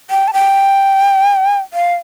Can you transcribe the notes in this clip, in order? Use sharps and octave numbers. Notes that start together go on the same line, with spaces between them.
G5
A5
G5
F5